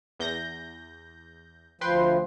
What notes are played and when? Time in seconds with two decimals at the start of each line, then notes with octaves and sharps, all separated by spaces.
0.20 E2 G6 A#6
1.81 D2 F3 B4 G5 C6